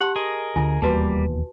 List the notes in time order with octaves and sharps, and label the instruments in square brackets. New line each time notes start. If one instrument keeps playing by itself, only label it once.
[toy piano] G4 A5 C6 [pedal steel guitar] F#5
[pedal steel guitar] G#4 A#4 D#5
[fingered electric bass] D2 D3 [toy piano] F4 G#5
[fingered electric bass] E1 D#2 [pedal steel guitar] G3 A#3 [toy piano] F#4 B4 A5